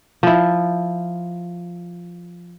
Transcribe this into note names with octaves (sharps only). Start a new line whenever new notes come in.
F3 E4